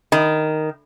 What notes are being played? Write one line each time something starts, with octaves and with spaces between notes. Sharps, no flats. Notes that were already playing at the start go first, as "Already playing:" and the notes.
D#3